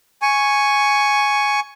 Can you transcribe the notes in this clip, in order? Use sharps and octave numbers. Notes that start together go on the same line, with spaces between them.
G#5 C#6